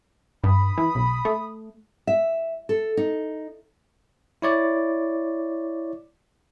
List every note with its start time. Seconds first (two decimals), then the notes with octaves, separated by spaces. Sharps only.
0.44 G2 B5 D#6
0.78 E3
0.95 B1
1.25 A3
2.07 E5
2.69 A4
2.97 D#4
4.42 E4 C#5 D5